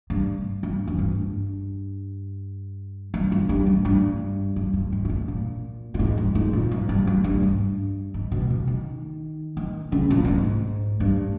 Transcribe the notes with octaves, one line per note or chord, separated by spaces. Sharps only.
G2
G2
E2
G2
G2
G2
G2
G#2
G2
G2
G2
G#2
G2
G#2
A#2
A#2
G#2
G2
G#2
A#2
G#2
G2
G2
G2
G2
G#2
B2
C#3
D#3
D#3
C#3
A#2
G2
G#2
G2